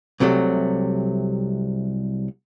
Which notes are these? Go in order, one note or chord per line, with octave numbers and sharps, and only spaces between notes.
C2 C3 F#3 A3